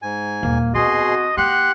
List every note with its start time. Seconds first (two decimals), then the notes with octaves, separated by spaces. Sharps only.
0.02 G#2 G#5
0.43 D#1 D2 A#3
0.75 B2 C4 F#4 G#4 D#5 C6
1.37 A#3 G4 F#5 C6 F#6